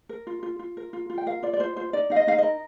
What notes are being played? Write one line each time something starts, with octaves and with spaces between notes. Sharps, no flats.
A#4
F4
F4
F4
A#4
F4
F4
G5
A#4 F5
F4 D5
D5
F4 C5
F4 C5
D#4 D5
D#4 F5
D#5
D#4 F5
A#4 D#5